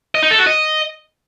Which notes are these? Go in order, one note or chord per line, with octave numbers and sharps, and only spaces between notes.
D#5
D#4
A4
F#4
D#5